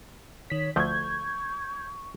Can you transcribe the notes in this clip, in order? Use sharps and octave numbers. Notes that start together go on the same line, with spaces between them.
D#3 C#5 B6
D2 F3 A3 C#6 G6 G#6